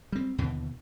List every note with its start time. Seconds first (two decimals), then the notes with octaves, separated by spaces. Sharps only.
0.12 G3 C4
0.38 D#2 B2 D3 E3